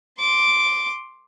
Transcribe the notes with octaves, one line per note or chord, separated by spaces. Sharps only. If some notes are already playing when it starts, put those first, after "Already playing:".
C6 D6